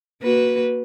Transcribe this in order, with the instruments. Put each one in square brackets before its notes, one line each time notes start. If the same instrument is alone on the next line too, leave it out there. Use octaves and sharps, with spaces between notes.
[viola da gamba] A#3 F#4 B4